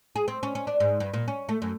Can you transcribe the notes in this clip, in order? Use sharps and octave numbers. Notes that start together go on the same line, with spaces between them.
G#4
C4
C#4
C#4
D4
G#2
G2
A#2
C#4
A3
F#2